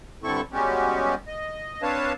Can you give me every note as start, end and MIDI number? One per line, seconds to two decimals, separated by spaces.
0.24 0.41 43
0.24 0.41 50
0.24 0.41 60
0.24 0.41 64
0.24 0.41 69
0.24 0.41 85
0.52 1.15 55
0.52 1.15 56
0.52 1.15 59
0.52 1.15 61
0.52 1.15 66
0.52 1.15 67
1.27 1.82 75
1.82 2.13 60
1.82 2.13 62
1.82 2.13 71
1.82 2.13 73
1.82 2.13 77
1.82 2.13 81